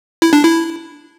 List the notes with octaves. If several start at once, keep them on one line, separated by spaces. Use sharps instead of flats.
E4
D4
E4